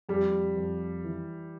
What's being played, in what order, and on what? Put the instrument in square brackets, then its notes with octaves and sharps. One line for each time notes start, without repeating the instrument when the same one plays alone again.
[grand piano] F2 [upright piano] G3
[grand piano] F2
E3